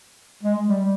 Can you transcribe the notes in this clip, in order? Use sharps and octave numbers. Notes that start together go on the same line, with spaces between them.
G#3
G3